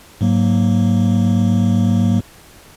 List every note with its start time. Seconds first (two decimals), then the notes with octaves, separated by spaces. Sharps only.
0.21 G#2 F#3 A#3